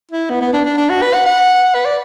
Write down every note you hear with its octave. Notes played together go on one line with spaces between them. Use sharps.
E4
B3
B3
D4
D4
D4
F#4
B4
F#5
F#5
B4
D5